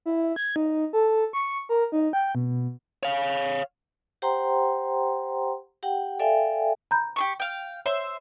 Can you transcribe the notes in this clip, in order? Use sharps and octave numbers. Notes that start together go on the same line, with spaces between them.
E4
G#6
D#4
A4
C#6
A#4
D#4
G5
B2
C#5 F5
G4 C5 F#5 G5 A#5 C6
G4 F#5 G5
A4 D5 E5 F5 G5 G#5
A#5 B5 G6
G4 G#4 C#6
F5 G5
C5 C#5 E5 C6